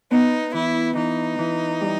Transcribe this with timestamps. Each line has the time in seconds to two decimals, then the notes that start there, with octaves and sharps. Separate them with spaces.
0.10 B3 D#4
0.54 E3 E4
0.95 E3 D#4
1.38 E3
1.81 G3